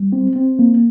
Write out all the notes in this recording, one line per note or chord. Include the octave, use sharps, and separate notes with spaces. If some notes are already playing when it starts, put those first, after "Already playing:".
Already playing: G3
C4
C4
A#3